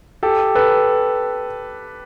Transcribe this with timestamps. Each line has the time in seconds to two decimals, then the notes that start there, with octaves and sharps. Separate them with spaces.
0.23 G4 A4
0.55 A4 B4